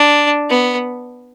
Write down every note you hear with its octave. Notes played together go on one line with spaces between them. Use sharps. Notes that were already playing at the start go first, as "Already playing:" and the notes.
Already playing: D4
B3